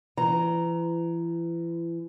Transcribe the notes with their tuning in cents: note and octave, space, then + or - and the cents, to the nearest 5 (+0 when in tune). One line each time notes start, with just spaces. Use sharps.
E3 +35 A#5 +0